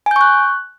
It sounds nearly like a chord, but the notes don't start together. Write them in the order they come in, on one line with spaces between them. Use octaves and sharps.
G#5 G6 C#6 F#6